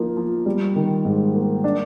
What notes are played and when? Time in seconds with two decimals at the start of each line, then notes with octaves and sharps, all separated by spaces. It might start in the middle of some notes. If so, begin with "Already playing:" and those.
Already playing: F3 A#3 D#4
0.17 F3
0.46 G3
0.76 D#3
1.05 G#2
1.35 A#3
1.64 D4